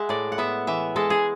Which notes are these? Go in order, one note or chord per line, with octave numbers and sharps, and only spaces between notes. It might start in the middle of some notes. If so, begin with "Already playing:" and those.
Already playing: G#3 E5 F#5
A2 D5
F#5
B3 E5
E3 E5
G#3 A4
G#4